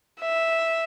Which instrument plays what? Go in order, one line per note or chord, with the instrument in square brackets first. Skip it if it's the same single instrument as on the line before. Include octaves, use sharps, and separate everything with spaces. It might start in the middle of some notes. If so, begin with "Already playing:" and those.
[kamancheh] E5